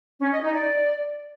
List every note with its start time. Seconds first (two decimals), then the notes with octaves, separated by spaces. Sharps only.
0.20 C#4
0.31 D#5
0.42 D#4
0.53 D5